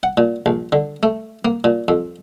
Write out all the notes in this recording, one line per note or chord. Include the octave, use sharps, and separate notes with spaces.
F#5
A#2
A#1
D3
A3
A#3
A#2
F2